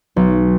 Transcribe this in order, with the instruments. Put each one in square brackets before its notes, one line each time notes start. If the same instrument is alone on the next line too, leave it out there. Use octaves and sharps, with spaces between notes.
[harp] B1